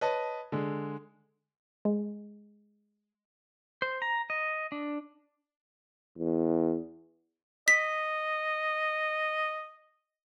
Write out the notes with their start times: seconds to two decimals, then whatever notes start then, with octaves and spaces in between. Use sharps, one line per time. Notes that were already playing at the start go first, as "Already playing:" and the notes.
0.01 B4 C#5 D#5 A5
0.52 D3 G#3
1.85 G#3
3.82 C5
4.02 A#5
4.30 D#5
4.72 D4
6.18 E2
7.68 D#5 B6